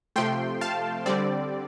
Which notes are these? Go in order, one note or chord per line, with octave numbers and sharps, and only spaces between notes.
C3 F3 A3 G5 C6
F5 A5
D3 G3 C4 D5